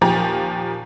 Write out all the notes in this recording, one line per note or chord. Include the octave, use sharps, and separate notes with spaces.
D#2 A#2 F3 G4 A#5